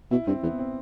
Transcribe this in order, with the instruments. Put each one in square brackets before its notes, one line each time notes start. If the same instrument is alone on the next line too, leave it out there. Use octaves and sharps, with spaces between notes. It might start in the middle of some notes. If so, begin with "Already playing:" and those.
[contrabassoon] B2 [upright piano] E4
[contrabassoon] G2 [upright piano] C4
[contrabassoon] E2 [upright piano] B3
[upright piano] C4